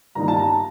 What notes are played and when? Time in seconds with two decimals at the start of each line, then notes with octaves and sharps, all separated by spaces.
0.15 G2 D#3 G3 A#3 D#4 A#5
0.28 A5
0.39 A#5